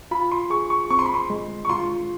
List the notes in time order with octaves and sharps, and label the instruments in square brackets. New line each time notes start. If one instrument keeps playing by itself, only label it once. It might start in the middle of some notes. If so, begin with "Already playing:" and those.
[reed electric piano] F4 [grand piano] B5
[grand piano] C6
[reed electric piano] G#4 [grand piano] C#6
[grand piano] C#6
[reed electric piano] C4 [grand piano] C#6
[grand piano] C6
B5
C6
[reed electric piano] G#3
[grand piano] C#6
[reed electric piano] F4 [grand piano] C6